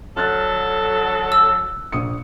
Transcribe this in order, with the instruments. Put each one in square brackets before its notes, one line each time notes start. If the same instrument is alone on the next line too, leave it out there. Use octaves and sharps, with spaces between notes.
[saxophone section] D3 F#3 A4 [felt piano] F6 F#6 A6
[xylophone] E6
[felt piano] A#1 D#6 C#7